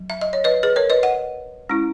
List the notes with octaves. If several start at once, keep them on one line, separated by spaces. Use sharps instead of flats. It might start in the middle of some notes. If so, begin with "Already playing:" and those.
Already playing: F#3
E5
D#5
C#5
B4 D#5
G#4 B4
A#4 C#5
B4 D#5
D#5 F#5
G#3 C#4 E4